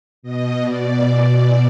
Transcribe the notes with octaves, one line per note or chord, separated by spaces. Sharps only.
B2 D#5
B2 D5